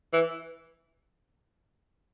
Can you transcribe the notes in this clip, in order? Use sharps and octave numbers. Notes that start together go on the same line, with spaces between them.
E3